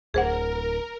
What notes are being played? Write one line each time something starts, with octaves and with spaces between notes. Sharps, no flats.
D1 G1 D2 G#4 A#4 C5 F#5